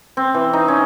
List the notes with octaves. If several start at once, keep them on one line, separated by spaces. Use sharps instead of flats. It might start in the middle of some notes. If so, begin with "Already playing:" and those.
C4
E3
D#4
C#4